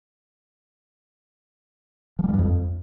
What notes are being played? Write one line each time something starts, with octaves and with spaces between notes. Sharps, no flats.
F3
G3
F3
G2
F2